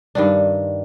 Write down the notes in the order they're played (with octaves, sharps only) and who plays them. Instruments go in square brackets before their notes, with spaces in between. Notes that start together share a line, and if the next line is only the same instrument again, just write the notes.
[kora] G2 D#3 D4